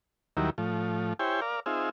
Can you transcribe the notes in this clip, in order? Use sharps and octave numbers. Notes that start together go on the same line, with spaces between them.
D#2 D#3 F#3 G3 E4 A#4
A2 F3
E4 G4 C5 C#5 G5 G#5
A#4 D5 F5
C4 D#4 F4 G#4 E5